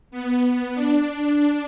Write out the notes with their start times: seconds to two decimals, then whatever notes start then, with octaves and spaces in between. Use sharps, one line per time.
0.11 B3
0.75 D4
1.07 D4